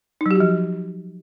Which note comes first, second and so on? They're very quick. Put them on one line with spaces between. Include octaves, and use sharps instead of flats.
D#4 F#3 G4 F#4 F3